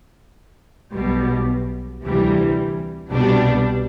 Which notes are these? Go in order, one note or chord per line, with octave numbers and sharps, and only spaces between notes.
B1 B2 G3
D2 C3 E3 G3
C2 B2 G3 D4